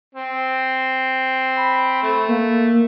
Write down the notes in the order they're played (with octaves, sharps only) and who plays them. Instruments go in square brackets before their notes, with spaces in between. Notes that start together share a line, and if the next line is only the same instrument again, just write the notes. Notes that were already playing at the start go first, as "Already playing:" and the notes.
[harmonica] C4
[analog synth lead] B5
[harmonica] A3
[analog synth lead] A#3